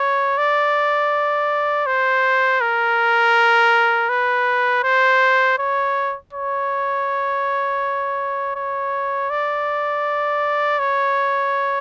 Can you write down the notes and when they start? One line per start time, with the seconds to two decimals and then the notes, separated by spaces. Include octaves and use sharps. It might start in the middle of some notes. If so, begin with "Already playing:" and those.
Already playing: C#5
0.38 D5
1.86 C5
2.61 A#4
4.09 B4
4.84 C5
5.58 C#5
6.33 C#5
8.56 C#5
9.30 D5
10.79 C#5